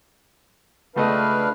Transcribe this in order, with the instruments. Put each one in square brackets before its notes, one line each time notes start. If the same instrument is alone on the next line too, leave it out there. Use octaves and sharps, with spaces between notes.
[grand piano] C#2 A3 D#5 [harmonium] D4 B4 F5